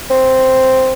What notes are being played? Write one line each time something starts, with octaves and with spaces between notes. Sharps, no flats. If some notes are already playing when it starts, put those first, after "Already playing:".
C4